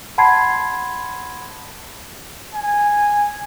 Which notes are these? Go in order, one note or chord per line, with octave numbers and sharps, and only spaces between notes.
F#5 A5 B5 C6 G#6 C7
G#5